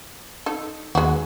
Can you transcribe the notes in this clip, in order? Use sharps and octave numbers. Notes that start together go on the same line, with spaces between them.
D#4 A4
D#2 G#3 F#4